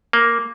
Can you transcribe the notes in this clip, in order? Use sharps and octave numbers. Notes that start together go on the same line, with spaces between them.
A#3